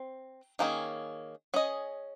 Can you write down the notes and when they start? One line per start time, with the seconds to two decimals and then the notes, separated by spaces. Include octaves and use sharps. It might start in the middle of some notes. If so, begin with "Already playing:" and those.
Already playing: C4
0.59 D#3 A#3 C#4 G#4
1.54 C#4 G#4 D#5